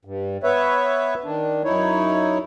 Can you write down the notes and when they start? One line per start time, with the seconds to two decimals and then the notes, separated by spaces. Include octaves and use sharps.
0.05 G2
0.43 B3 B4 C#5 E5
1.24 D#3 D4
1.64 F#2 D#4 E4 C#5